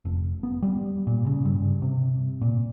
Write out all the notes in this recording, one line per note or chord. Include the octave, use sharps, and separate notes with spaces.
F1
B3
G3
A#2
C#3
G2
C3
A#2